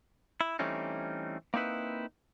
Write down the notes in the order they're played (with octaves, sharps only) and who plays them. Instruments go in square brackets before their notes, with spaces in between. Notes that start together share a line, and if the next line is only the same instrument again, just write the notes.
[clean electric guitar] E4
E3 G3 A3 C4 C#4 D#4
A#3 C4 D#4 E4 B4